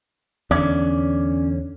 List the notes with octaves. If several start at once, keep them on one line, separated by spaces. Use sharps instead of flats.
E2 D3 C#4 D5